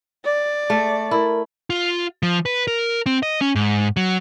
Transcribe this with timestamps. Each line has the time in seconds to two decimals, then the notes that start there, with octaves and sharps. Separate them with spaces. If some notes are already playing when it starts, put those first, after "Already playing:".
0.25 D5
0.70 A3
1.11 E4 A#4
1.70 F4
2.23 F3
2.46 B4
2.67 A#4
3.06 C4
3.23 D#5
3.41 C#4
3.55 G#2
3.97 F#3